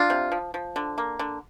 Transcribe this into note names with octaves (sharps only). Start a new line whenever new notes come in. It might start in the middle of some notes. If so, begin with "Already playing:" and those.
Already playing: D4 F4
C3
F3
F3
D3
A#3
D3